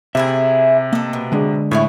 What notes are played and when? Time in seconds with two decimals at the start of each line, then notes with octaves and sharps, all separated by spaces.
0.15 C3 A3 E4 G#4 E5
0.93 A#3 A4 D#5
1.13 B2
1.32 D3 G#3 D4
1.71 A2 E4 C#5 G#5